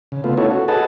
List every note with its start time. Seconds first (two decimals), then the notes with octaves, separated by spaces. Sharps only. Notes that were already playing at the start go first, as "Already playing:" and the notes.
0.12 C#3
0.24 A3 B3 F4
0.37 C#4 D#4 E4 F#4 A4 C#5
0.51 F#4
0.68 G#4 A4 B4 D#5 F#5 A5